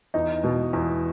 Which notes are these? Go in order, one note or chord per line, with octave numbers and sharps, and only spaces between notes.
E2 D#4
B2
E2